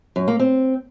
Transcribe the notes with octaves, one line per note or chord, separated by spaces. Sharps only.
F#2
A#3
C4